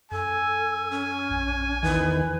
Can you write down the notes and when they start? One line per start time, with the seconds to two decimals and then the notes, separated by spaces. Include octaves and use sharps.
0.11 F#2 A4 G#5
0.91 C#4
1.31 A#1
1.83 E2 D#3 B4